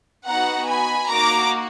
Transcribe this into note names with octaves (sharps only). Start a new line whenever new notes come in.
B3 D#4 F#4 F#5 A#5
G#5 B5
A#3 D#4 F#4 A#5 D6